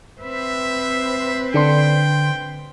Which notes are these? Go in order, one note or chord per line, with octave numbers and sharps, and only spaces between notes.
C4 B4 C5 E5
D3 D4 G5 C6